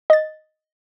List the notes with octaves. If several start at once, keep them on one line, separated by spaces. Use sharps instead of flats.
D#5 A6